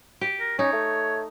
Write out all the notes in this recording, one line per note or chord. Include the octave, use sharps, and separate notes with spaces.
G4
A#4
C#4 D#4 C#5
A3